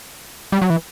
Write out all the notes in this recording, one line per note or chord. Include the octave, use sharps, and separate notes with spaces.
G3
F#3
E3